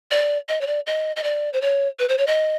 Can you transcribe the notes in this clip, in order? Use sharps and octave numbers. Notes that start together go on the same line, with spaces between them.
D5
D#5
C#5
D5
D#5
D#5
D5
C5
C#5
B4
C5
C#5
D#5